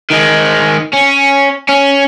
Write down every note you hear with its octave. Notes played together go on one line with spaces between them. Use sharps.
D#3 G#3
C#4
C#4